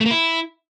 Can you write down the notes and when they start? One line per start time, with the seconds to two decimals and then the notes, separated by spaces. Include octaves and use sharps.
0.01 A3
0.06 A#3
0.11 E4